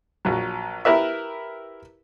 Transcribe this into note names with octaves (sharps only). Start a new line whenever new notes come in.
A#1 F#3
E4 G4 A#4 B4 E5